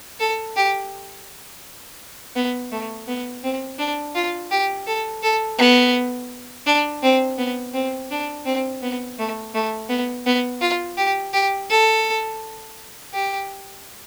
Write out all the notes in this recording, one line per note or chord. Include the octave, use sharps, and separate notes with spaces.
A4
G4
B3
A3
B3
C4
D4
F4
G4
A4
A4
B3
D4
C4
B3
C4
D4
C4
B3
A3
A3
B3
B3
F4
G4
G4
A4
G4